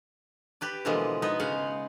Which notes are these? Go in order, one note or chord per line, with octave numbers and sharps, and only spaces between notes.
G4 B4 D5
B2 D3 E3 F3 G#3 A#3
B3 D#4 B4
C#3 G#3 F5 F#5